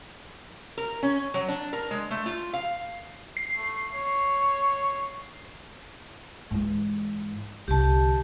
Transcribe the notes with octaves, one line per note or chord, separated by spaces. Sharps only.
A#4
C#4
F#3
D4
A#4
G#3
A3
F4
F5
C7
A3
C#5
G#2 E3
C2 D3 G4 A5